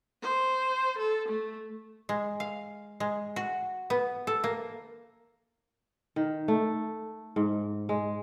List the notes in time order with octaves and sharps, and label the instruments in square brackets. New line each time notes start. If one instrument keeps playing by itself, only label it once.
[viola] C5
A4
A3
[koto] G#3
F5
G#3
F#4
B3
A4
A#3
[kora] D#3
A3
G#2
G#3